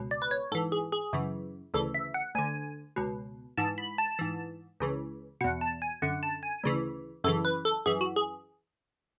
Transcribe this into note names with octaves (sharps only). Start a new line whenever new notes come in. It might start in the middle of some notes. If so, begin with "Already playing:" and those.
Already playing: C#2 B2
D5
B4
C#5
G#2 E3 A4
G#4
G#4
F#2 C#3 E3
D2 C#3 E3 A4
E5
F#5
D2 D3 G#5
C#2 B2
G#2 E3 A5
B5
A5
G#2 E3
C#2 C#3 E3
E2 B2 F#5
A5
G#5
F#2 D3 F#5
A5
G#5
D2 C#3 E3
F#2 C#3 E3 A4
B4
A4
F#2 E3 G#4
F#4
G#4